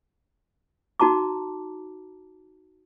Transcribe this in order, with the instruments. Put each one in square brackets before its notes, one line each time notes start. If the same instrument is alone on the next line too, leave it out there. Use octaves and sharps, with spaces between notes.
[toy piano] D#4 F#4 A5 A#5 D6